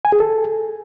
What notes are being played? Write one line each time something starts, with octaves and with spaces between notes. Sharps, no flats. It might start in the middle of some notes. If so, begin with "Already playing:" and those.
G#5
G#4
A4